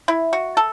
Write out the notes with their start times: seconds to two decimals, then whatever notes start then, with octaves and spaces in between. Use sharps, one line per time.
0.08 E4
0.33 F#4
0.57 A4